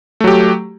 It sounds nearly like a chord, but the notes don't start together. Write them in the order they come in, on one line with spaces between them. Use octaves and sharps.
A3 F#3 G4